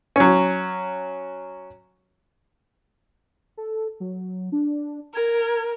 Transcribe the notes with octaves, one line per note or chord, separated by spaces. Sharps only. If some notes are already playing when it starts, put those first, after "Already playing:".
F#3 C#4
A4
F#3
D4
A#4 G#6